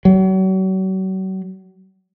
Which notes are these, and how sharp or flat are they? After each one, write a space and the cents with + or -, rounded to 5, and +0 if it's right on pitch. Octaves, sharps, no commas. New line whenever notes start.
F#3 +35